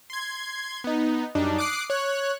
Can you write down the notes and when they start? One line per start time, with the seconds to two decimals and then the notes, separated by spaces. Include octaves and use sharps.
0.10 C6 G#6
0.84 B3 D#4
1.35 F#2 G3 D4 D#4
1.58 D6 D#6 F#6 C7 D7
1.90 C#5 F#6